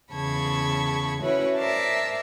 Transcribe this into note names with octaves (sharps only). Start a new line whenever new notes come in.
E2 C#3 A5 B5 C#6 G#6
C#4 E4 F#4 B4 C#5
A#4 C5 D5 E5 A5